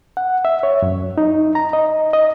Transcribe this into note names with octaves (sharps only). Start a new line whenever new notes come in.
F#5
E5
C#5
F#2
D#4
A#5
D#5
D#5